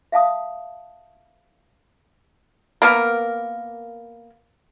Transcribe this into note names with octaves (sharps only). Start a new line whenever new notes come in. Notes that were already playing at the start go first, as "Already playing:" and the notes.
E5 F5 A5 D#6
A#3 B3 A#4